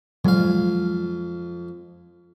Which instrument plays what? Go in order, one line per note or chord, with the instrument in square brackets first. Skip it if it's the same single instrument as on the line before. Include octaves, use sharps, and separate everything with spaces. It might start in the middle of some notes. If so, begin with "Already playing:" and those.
[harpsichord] F2 F5 [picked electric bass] F#3 G#3